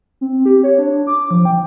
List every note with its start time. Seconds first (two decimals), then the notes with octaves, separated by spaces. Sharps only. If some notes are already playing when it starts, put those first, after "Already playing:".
0.21 C4
0.46 G4
0.63 C#5
0.79 D4
1.07 D6
1.31 F3
1.45 G5